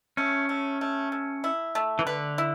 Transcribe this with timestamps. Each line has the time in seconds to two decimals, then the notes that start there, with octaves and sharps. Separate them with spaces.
0.17 A3 C#4
0.49 A3
0.81 A3
1.12 A3
1.44 E4
1.75 A3
1.99 E3
2.06 D3 B4
2.38 E4